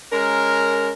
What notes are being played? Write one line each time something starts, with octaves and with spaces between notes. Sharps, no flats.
G#3 C#4 A#4